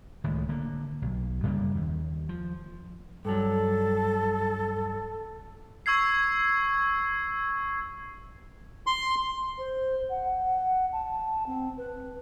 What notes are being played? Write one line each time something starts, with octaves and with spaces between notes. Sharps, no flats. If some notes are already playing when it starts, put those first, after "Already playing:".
C#2 A2 D#3 G#3
D3 A#3
B1
F#2 C#3 G3 A#3
D#2
F3
G2 F#3 A4
C#6 E6 G#6 C7
C6
C5
F#5
A5
C4
B4